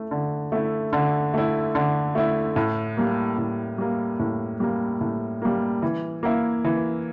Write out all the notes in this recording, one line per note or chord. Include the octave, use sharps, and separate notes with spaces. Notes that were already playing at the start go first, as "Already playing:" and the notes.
Already playing: A3 E4
D3
A3 E4
D3
A3 E4
D3
A3 E4
A2
G3 A#3
A2
G3 A#3
A2
G3 A#3
A2
G3 A#3
E3
A#3 E4
E3